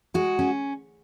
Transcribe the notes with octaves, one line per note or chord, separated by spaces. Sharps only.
G#3 F#4
C#4